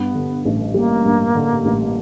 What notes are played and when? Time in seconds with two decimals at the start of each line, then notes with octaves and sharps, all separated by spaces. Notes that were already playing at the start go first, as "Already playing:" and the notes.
Already playing: G2 B3
0.14 D3
0.45 A1
0.74 G3 A#3
1.05 G2
1.35 D3
1.65 A1